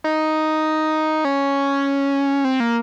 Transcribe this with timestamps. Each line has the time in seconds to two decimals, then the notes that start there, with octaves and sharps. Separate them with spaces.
0.04 D#4
1.25 C#4
2.45 C4
2.60 A#3